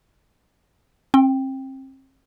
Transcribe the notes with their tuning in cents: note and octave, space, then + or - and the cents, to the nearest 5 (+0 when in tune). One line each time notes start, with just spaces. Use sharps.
C4 +35 G5 +0